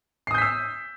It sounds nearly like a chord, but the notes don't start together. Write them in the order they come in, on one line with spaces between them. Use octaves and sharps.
C7 D#6 G6 B6 E6